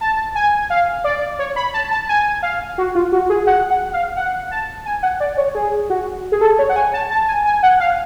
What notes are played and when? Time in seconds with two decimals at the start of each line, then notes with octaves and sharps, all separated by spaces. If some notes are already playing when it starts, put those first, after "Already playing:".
0.01 A5
0.35 G#5
0.70 F5
1.04 D5
1.39 C#5
1.56 B5
1.74 A5
1.91 A5
2.09 G#5
2.43 F5
2.78 F#4
2.95 F4
3.12 F#4
3.29 G#4
3.47 F#5
3.70 F#5
3.93 F5
4.16 F#5
4.51 A5
4.86 G#5
5.03 F#5
5.20 D5
5.37 C#5
5.55 G#4
5.90 F#4
6.32 G#4
6.41 A4
6.59 C#5
6.69 F#5
6.76 G#5
6.93 A5
7.10 A5
7.28 G#5
7.45 G#5
7.63 F#5
7.80 F5